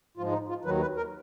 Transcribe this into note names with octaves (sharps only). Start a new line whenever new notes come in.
G#2 F3 G#3 F4
D#4
F4
D#2 D#3 F#3 B4
B4
A#4